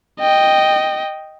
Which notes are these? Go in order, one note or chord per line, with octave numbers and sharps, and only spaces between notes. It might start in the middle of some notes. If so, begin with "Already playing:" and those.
D#5 G5